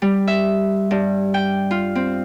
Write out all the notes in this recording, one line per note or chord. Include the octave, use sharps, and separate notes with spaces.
G3
E5
G2
G5
F4
C4